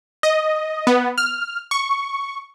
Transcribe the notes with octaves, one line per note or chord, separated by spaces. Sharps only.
D#5
B3
F6
C#6